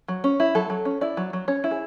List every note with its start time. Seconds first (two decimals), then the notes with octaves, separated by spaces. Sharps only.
0.08 F#3
0.24 C#4
0.40 E4
0.55 F#3 A4
0.70 F#3
0.85 C#4
1.01 E4 D5
1.17 F#3
1.33 F#3
1.48 C#4 C#5
1.64 E4
1.71 G#4